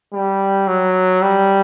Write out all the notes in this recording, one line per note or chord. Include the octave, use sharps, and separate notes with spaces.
G3
F#3
G3